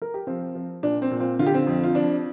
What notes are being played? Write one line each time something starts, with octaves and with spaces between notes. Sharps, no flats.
A#4
G4
F3 C4 F4
F3
A#2 D4
C4
A#2
C4 F4
D3 F4
G4
C4 F4
F2
F4
F3 D4